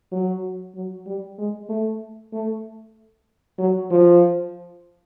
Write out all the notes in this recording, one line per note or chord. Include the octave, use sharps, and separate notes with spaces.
F#3
F#3
G3
G#3
A3
A3
F#3
F3